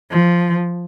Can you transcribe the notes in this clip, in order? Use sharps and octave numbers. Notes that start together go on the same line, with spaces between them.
F3